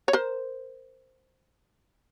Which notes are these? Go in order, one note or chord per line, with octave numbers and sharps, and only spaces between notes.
C#5
A#4 C5